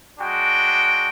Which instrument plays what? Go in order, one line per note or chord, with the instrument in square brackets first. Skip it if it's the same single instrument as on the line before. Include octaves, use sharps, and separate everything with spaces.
[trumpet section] G#3 D4 F#4 G5